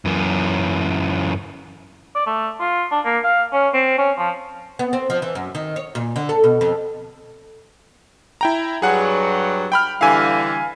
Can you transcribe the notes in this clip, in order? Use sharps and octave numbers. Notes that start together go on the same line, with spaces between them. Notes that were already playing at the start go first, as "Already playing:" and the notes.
F#2 E3
D5
A3
F4
D4
A#3
F5
C#4
C4
C#4
F3
B3
C4
F3
E3
F#2
D#3
C#5
A#2
D3
A4
B2
F2
E4 G5 A#5
G2 F#3 G#4 F#5
G5 B5 F6
D3 E3 G3 F5 G#5